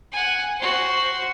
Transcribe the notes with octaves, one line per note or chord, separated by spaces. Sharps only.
F#5 G#5
F#4 C5